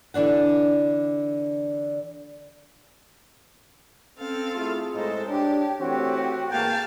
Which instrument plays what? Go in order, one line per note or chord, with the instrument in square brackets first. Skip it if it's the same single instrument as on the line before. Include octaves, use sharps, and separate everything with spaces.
[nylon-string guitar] D3 E3 D4 F#5
[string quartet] C4 A4 F5 [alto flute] C#4
[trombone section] A3 E4 F4 [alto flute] G#4
[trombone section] A2 G#3 D#4 [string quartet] A4 C5
[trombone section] D4 [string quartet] G4 [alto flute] C#5
[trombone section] E3 A3 C4 [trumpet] F#4 [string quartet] G4
[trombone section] G#2 E3 A#3 [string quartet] G#4 F5 A5 [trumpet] G5